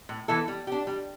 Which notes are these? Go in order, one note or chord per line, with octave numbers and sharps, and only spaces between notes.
A2
E3 B3 E4 A4
G3
D4 G4
G3